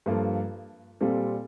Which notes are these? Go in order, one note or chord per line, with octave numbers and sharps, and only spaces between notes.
G2 F3 A#3 F4 A4
A#2 G3 C4 F4 A4